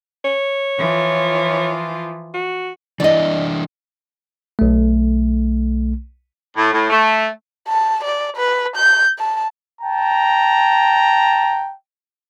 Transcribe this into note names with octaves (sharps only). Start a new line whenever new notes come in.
C#5
E3 F3 F4
F#4
E3 D4 E4 D5 D#5
B1 A3
A2
A2
A3
A5
D5
B4
G6
A5
G5 A5 A#5